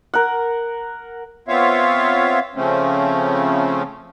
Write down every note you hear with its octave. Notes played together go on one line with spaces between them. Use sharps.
A#4 F#5
B3 C4 F4 C#5 E5 F5
C#3 F3 A3 C4 C#4